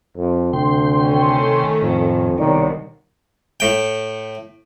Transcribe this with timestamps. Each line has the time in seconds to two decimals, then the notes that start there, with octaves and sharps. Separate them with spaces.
0.17 F2
0.53 D2 C3 G5 C6
0.98 D#3 A3 C#4
1.82 F2 A2
2.38 C2 B2 D#3 C#5 D5
3.60 A2 G5